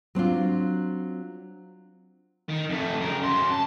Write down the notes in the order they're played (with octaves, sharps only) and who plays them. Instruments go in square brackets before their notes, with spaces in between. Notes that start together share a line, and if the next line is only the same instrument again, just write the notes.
[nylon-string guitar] F#3 C4 D4 F4
[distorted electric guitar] D#3
F2 A3
C#3 A#4
F#2 C6
A5